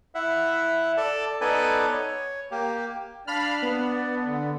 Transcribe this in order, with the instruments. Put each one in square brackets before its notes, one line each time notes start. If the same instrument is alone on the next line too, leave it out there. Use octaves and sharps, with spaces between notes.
[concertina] E4 E5 F#5
A4 D5 A5
B3 D#4 A4 B4 D5 G#5
C#5
A#3 G4
[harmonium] D4 D5 [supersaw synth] F5 B5 F6
[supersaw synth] B3
[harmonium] D3